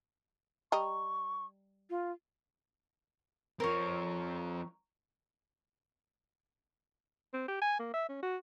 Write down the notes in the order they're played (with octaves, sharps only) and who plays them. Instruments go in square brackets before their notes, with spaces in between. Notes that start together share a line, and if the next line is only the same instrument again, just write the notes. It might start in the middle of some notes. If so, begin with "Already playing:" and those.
[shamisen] G3 D#5 A#5 [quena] C#6
[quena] F4
[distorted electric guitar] F3 C4 [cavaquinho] A#4 C#5
[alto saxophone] C4
G4
G#5
A#3
E5
C#4
F#4